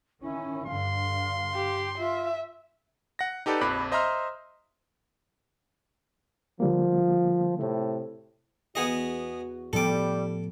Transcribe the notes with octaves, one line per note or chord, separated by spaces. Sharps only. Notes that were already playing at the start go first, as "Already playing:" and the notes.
D#3 C#4 E4
G2 D3 F5 C6
G4
F4 E5
F#5 A#6
D#4 G4 A4 B4 D5
A#1 F2 B5 D6 F#6
C5 D#5 E5 A#5 C6 F6
D3 F3 G3 A#3
A2 C3
E2 B3 F#4 G#4 D#5
A2 F3 G3 B3 A4 D6